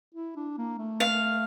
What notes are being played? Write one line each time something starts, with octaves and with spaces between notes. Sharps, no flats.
E4
D4
A#3
A3
F5